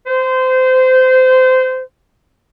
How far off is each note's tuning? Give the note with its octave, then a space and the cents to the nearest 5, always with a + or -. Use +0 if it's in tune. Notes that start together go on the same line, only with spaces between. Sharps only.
C5 -25